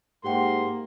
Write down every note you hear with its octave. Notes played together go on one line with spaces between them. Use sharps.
G#2 A#3 G4 F#5 G5 C6